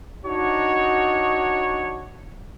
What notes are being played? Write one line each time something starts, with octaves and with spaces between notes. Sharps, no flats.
D4 D#4 F#4 C#5